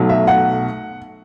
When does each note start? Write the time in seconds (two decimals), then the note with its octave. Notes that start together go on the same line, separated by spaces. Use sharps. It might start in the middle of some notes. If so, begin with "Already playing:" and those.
Already playing: B1 B2 F#3 A3
0.09 E5
0.27 F#5